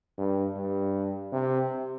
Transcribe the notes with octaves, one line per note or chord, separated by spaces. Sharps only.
G2
G2
C3